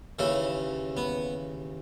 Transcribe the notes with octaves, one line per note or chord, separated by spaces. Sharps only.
D#2 C#3 E3 E4
B3